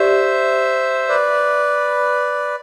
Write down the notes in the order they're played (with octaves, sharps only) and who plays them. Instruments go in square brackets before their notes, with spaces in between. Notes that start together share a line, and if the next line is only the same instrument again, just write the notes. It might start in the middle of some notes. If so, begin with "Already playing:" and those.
Already playing: [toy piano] G4 D5 [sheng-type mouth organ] C5 E5
[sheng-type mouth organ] B4 D5